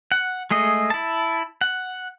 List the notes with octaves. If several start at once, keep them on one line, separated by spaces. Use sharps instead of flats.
F#5
G#3 A3 G#4 D#5
E4 A5
F#5